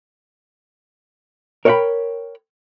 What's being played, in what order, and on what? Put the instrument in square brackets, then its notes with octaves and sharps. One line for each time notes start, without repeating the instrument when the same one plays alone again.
[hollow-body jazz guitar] A#4 C#5 E5 F#5 G5 B5